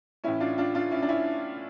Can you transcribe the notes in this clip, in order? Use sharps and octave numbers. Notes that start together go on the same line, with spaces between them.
A2 E3 C#4 E4
D4 F4
D4 F4
D4 F4
C#4 E4
D4
C#4 E4